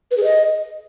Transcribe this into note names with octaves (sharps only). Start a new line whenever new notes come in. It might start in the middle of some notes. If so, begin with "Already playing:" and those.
B4
G#4
D#5